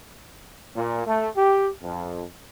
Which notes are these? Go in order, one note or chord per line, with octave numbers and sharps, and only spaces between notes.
A#2
A3
G4
F2